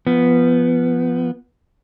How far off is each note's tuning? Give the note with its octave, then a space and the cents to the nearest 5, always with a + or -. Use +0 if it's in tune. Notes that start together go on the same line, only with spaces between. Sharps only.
F3 -20 B3 +0